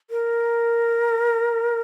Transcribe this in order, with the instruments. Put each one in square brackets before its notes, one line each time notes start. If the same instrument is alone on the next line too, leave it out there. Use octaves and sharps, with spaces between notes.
[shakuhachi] A#4